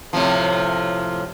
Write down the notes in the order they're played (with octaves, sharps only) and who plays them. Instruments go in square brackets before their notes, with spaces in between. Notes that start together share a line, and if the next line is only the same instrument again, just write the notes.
[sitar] A2 C3 F3